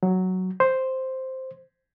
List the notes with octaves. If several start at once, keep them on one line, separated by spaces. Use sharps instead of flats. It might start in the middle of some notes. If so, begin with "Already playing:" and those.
F#3
C5